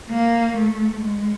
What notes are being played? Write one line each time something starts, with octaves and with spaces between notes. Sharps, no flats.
A#3
A3
G#3